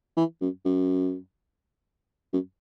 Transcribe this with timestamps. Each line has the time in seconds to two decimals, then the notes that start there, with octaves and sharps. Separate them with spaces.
0.17 E3
0.41 F#2
0.65 F#2
2.33 F#2